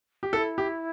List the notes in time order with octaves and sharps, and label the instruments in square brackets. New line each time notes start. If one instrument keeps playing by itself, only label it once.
[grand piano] G4
[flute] E4 [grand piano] A4
[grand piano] G4